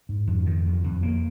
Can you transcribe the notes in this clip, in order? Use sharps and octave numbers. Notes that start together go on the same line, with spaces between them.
G#2
F2
D#3
F2
F2
A#3